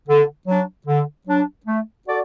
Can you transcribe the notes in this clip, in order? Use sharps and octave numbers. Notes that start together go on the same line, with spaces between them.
D3
F#3 D4
D3
F#3 D4
A3
F#4 A4 D5